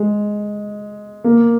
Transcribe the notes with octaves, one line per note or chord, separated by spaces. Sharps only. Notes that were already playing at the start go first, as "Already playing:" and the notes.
Already playing: G#3
A#3